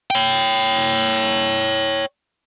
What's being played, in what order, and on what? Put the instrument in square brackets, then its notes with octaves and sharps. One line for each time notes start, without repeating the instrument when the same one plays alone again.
[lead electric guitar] C#5 G5